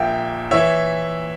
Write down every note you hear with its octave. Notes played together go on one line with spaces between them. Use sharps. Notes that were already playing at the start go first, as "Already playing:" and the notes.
Already playing: A#1 A#2 A#3 E5 G5
E3 C#5 E5